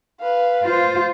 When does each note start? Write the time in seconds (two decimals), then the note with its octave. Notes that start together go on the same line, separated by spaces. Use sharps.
0.20 B4 F5
0.63 F4 C5